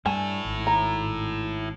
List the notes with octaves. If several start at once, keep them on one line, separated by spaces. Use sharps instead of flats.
G2 E4 A4 G#5
G#1
A#5